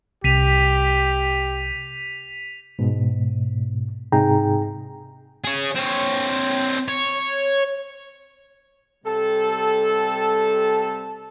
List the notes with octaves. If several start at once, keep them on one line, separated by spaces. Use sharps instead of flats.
C2 G4 B6 D#7 F7
G#2 B2
G#2 C3 D#4 G#4 G5 A#5
G#4 C#5
C4 C#5
C#5
C3 G3 A4